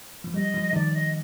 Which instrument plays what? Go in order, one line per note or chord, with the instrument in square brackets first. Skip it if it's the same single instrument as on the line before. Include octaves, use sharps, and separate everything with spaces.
[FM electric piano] F3
[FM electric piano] G3 [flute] D#5
[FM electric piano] F3
[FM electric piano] D#3 [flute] D5
[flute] D#5